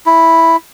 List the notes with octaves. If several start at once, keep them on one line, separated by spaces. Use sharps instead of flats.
E4